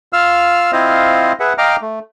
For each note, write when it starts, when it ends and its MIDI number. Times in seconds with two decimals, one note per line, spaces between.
0.13 0.71 65
0.13 0.71 77
0.13 0.71 88
0.13 0.71 89
0.73 1.32 60
0.73 1.32 64
0.73 1.32 65
0.73 1.32 72
0.73 1.32 75
0.73 1.32 77
1.40 1.53 68
1.40 1.53 71
1.40 1.53 76
1.40 1.53 78
1.58 1.76 75
1.58 1.76 77
1.58 1.76 79
1.58 1.76 82
1.58 1.76 86
1.58 1.76 89
1.82 1.99 57